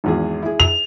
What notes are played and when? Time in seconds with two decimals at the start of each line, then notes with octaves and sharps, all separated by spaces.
0.04 G#1 E2 G#4
0.43 E4 G#4
0.60 F7